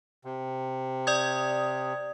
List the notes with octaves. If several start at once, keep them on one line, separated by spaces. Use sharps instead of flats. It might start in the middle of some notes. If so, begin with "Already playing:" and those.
C3
D5 D#6 G#6